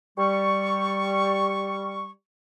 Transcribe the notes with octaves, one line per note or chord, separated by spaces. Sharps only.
G3 C#6